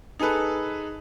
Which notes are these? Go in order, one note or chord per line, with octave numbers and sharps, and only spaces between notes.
D#4 G#4 A4 B4